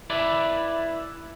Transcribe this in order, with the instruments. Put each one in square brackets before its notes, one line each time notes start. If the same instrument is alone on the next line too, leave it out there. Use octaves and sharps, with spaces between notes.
[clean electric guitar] E4 B4 D5